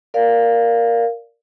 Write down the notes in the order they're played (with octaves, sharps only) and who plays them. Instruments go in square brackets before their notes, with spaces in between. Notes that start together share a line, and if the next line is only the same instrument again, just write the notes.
[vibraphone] A#4 D5 F5